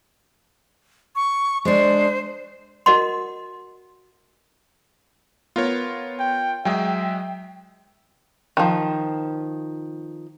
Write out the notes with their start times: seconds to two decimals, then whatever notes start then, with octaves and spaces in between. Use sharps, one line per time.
1.15 C#6
1.65 G#3 D4 C5
2.86 F#4 A#4 D#5 F#5 C6
5.56 B3 F4 A#4 C#5
6.20 G5
6.65 F#3 G#3 G#4 E5 G5
8.57 D#3 F3